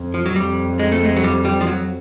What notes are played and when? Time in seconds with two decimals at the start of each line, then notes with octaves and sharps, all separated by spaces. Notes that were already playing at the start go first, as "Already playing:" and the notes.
Already playing: F2
0.14 F3
0.26 F#3
0.36 F2 G3
0.79 G#3
0.92 A3
1.05 G#3
1.16 F#3
1.24 G3
1.45 G3
1.61 F3
1.67 F#3